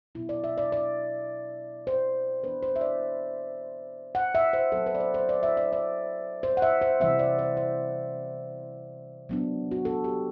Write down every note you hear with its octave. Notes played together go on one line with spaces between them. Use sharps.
B2 F#3 B3 E4
D5
E5
D5
D5
C5
E3 B3 D4 B4
C5
E5
D5
F#5
E5
C5
F#3 C4 A4
B4
D5
C5
C5
D5
E5
D5
D5
C5
F#5
E5
C5
C3 E3 G3 C4 E5
D5
C5
C5
F#3 B3 D4
F#4
A4
G4